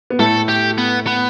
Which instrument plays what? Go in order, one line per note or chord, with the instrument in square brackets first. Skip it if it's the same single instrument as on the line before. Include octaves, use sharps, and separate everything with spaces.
[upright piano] B3
[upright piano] A2 A3 [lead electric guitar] A4
[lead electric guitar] G4
B3
B3